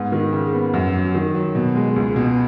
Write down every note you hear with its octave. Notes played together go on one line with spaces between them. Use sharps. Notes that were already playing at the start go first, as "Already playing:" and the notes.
Already playing: G#2 B3
D#3
C#3
B3
F#2
F#3
D#3
F#3
B2
G#3
C#2
B2